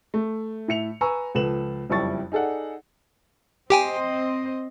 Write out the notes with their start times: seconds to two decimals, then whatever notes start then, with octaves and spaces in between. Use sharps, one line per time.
0.14 A3
0.68 A2 E5 C#7 F7
1.01 B4 G#5 A#5 C#6 E6
1.35 C#2 F3 A4 B4 E7 F#7
1.90 F#1 F2 G3 E4 C#6 A6
2.32 D#4 G#4 A4 D5 F#5
3.70 C4 G4 C5 D#5 G5 G#5